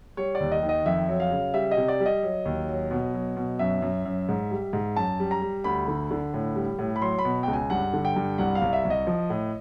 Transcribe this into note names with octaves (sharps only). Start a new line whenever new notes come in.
G3 C#5
D5
D#2
D#5
D#3
D#5
F2 E5
F#3
F5
C#3
G3 E5
D#5
C3
D5
G3
D#5
F#3
D#2
F#3
B2
F#3
B2
F#2 E5
F#2
F#2
G#2
G3
G#2
F#2 A5
G3
A#5
G3
D2 B5
D3
D3
A2
G3
A2
B5
F#3 C6
B5
B2
G5
C#2
G#5
G2 F#5
D3
G5
G2
C2 F#5
F5
C2
E5
C2
D#5
F3
A2